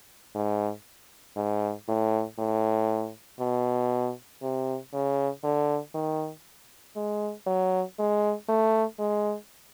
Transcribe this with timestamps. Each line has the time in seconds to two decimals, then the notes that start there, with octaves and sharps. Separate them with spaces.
0.35 G#2
1.36 G#2
1.88 A2
2.39 A2
3.40 B2
4.42 C3
4.93 C#3
5.44 D3
5.95 D#3
6.96 G#3
7.46 F#3
7.99 G#3
8.49 A3
8.99 G#3